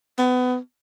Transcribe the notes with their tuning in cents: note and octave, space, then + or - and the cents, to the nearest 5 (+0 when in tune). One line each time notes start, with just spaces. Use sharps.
B3 +25